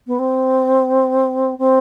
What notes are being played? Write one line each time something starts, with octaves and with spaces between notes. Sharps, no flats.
B3
C4
C4